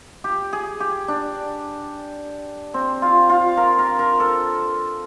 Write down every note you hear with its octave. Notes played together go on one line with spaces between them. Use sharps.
G4
G#4
G4
D4
C4
F4
F4
A#4
A#4
A#4
A4